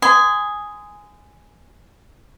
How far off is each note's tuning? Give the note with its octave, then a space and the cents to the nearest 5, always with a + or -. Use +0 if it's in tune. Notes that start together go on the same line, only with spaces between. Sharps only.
G#5 +0 C6 -35 D#6 +5